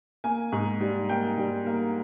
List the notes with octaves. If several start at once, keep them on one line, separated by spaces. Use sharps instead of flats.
A#3 G#5
G#2
G3
A#3 G5
G3
A#3